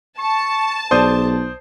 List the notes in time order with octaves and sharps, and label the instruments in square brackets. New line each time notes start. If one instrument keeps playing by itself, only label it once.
[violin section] A5 [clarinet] C#6
[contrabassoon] B1 [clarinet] G#4 [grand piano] C5 D5 D#6